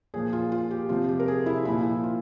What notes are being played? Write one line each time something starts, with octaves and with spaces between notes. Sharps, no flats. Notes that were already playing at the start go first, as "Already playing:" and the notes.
A#2 F3 G#4
F4
F4
G4
C3 F3 F4
G4
A#4
G#4
E4
A#2 F3 E4
E4
F4